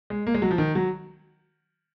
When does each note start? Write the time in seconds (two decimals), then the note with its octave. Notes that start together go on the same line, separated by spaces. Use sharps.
0.10 G#3
0.27 A#3
0.35 G#3
0.42 F#3
0.51 F3
0.58 D#3
0.75 F#3